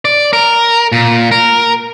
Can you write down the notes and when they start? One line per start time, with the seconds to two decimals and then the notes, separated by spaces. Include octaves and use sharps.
0.05 D5
0.33 A#4
0.92 A#2
1.32 A#4